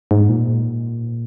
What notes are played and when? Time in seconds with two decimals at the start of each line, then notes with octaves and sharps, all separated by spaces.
0.11 G#2
0.29 A#2